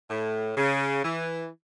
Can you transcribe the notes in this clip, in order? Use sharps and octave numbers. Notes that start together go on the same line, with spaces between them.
A2
C#3
E3